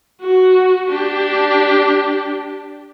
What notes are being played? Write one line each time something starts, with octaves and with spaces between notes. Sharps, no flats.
F#4
D4 G4